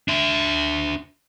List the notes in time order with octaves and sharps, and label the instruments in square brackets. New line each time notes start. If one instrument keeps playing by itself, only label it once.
[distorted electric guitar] D4 E5